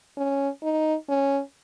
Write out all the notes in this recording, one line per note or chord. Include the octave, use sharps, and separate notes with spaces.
C#4
D#4
C#4